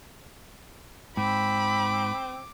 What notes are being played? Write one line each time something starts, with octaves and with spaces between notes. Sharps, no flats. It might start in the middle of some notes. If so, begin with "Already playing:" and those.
G#2 C4 B5 D6